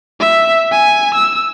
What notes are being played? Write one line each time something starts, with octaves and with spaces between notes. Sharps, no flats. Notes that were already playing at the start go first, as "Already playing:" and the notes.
E5
G#5
E6